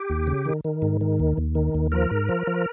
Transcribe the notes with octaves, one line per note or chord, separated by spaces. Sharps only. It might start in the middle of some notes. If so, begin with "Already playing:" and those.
Already playing: G4
D#2
C#3
D#3
D#3
G#2
D#3
D#2
D#2
D#3
D#2
F3 A#4
G#2
F3
F3